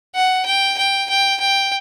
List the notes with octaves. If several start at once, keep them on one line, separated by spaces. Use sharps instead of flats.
F#5
G5
G5
G5
G5